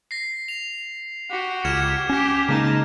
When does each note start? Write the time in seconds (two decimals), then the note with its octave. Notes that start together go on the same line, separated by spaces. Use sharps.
0.11 A#6 C7
0.48 F7
1.30 F#4 G4
1.65 C#2 F6 G#6 E7
2.09 C#4 G4
2.49 C#3 G#3 A#3 D#4 A5